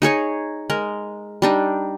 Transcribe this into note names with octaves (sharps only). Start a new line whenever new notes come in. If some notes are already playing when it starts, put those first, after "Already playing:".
D#4 G#4 C#5 G#5
G#3 A#4
G3 D4 D#4